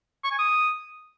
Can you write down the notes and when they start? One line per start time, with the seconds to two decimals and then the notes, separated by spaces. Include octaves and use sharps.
0.24 C#6
0.31 G#5
0.38 D#6